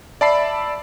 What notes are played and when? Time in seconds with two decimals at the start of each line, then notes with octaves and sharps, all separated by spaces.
0.21 D5 E5 A5 B5 E6 C7